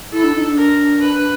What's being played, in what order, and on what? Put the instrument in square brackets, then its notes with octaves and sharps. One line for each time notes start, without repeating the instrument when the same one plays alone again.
[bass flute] E4 [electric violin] A4
[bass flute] D4
D#4
D4
[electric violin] A#4
B4